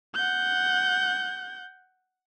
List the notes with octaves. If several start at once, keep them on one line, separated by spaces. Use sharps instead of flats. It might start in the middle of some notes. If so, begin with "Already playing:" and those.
F#5 G6